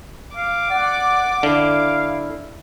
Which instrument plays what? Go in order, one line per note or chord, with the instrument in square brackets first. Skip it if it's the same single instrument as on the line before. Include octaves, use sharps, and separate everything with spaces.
[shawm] F5 [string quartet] D6
[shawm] D5 [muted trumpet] F#5
[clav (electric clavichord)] D3 [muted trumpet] E4 [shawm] F5